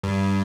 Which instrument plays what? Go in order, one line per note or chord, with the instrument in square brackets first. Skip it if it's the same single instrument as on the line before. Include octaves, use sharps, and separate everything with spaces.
[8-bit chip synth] G2